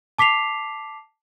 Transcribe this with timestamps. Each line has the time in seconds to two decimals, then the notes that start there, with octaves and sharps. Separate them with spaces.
0.18 A5 D6 B6 C7 F7